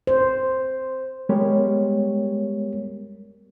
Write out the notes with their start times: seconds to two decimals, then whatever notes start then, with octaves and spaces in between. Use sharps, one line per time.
0.07 C5
1.29 G3 G#3 B3 G4 A#4 C#5